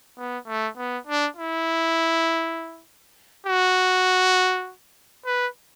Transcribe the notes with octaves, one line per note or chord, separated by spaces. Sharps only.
B3
A3
B3
D4
E4
F#4
B4